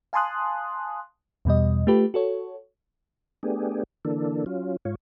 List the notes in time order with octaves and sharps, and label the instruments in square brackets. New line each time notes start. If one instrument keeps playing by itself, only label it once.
[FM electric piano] F5 G#5 A5 C6 D#6 F#6
E2 B2 G3 D#5
A3 F4 G4 B4
F#4 A4 C#5
[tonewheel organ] A3 B3 D4 G4 G#4
D3 E3 A#3 D4 A4
F#3 C#4 F4
G#2 F4 C#5